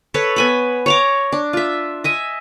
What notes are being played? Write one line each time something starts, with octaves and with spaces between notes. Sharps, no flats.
A4 B4 C#5
B3 G#5 B5
C#5 A#5 D6
D4
F4 E5
D#5 E5 G#5